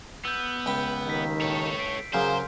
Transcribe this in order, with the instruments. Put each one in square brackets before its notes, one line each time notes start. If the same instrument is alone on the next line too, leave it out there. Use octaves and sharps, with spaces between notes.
[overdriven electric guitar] B3 [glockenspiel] E6 G6
[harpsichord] C#2 G5 B5
[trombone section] D#2 D#3 [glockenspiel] E6 B6
[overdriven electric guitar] A4 C#5
[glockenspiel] B6 C7 D7
[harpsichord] C#3 F#3 A#3 [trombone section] G#4 [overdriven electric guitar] C5 [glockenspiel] C6 F6 G6